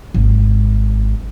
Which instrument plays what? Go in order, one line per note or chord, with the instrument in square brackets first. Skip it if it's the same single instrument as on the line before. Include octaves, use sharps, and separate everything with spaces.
[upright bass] G#1